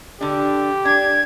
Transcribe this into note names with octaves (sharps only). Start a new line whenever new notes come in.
D3 D4 G4
D4 G#6